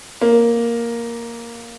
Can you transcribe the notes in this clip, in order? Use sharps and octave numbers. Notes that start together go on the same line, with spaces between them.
A#3